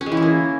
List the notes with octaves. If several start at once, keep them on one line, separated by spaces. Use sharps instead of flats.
C#4
G#3
E3
E4
A#3